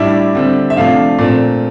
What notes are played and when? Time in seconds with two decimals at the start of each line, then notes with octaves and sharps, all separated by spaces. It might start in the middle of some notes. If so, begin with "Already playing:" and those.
Already playing: A2 G3 D4 E4 E5
0.35 D3 G3 C4
0.70 E5
0.76 C3 F3 A3 D4 F4 F5
1.19 A#2 A3 C4